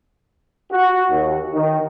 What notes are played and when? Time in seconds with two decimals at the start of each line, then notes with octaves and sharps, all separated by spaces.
0.71 F#4
1.11 D#2
1.54 D#3